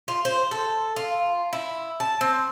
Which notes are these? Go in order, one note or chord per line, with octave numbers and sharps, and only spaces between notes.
F4
C5
A4
F4
E4
A5
C4